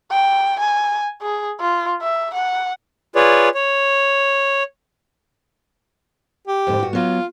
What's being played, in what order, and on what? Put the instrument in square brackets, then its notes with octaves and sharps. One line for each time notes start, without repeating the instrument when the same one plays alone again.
[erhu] G5
G#5
G#4
F4
E5
F#5
[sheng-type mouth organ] F4 G#4 B4 C#5 D5
C#5
[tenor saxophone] G4
[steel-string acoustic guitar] F2 G#2 D3
G2 F#4
[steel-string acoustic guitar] F#3 B3 [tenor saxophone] F4